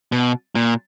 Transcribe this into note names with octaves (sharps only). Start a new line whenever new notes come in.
B2
A#2